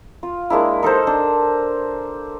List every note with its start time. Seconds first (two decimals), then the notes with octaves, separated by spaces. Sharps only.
0.23 F4
0.50 G#3 A#3 D4 E4
0.83 D#4 A4 A#4 C5
1.07 D4